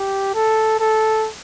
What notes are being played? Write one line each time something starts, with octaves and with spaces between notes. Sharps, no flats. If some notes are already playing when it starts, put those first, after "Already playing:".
Already playing: G4
A4
A4